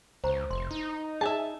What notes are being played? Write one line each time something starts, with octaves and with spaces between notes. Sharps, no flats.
C#2 C5 A#5 C#6
F1 C6
D#4
G#4 E5 G#5 A5